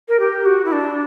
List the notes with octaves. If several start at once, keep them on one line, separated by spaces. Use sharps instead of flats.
A#4
G4
F#4
E4
D4